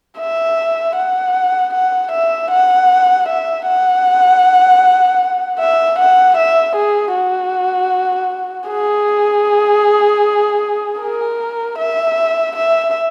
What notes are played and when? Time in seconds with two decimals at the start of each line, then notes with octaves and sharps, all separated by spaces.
0.19 E5
0.96 F#5
1.74 F#5
2.12 E5
2.50 F#5
3.28 E5
3.67 F#5
5.60 E5
5.99 F#5
6.37 E5
6.76 G#4
7.15 F#4
8.69 G#4
11.01 A#4
11.79 E5
12.56 E5